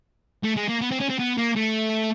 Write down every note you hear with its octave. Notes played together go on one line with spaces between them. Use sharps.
A3
G#3
A#3
B3
C4
C#4
C4
B3
A#3
A3